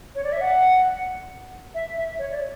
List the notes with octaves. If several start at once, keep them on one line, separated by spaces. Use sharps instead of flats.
C#5
D5
E5
F#5
E5
E5
C#5
D5